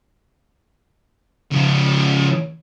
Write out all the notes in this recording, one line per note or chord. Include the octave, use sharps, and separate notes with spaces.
C#3 F3